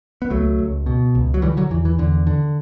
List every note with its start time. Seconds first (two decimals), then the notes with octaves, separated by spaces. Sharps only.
0.22 B3
0.30 C#2 F#3 A3
0.59 C#2
0.86 B2
1.15 C#2
1.34 F#3
1.42 D3 E3 G3
1.57 D3 F#3
1.70 E2 E3
1.85 E3
1.98 E2 D3
2.27 D3